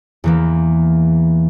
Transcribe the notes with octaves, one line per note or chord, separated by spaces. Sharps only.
E2 E3 A#3